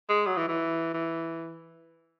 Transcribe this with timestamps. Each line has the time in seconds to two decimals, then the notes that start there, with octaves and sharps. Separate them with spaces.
0.09 G#3
0.26 F#3
0.37 E3
0.48 E3
0.94 E3